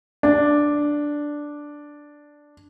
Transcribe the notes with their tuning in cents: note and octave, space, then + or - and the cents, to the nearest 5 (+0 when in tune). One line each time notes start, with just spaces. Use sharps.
D4 +0